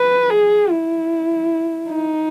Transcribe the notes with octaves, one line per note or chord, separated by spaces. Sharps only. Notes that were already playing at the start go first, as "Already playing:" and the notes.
Already playing: B4
G#4
E4
D#4